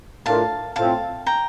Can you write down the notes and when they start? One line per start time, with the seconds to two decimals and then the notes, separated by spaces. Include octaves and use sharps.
0.25 A2 A3 D4 F4 A#4 F5 A5
0.76 A2 A3 C4 F4 F5 A5
1.26 G5 A#5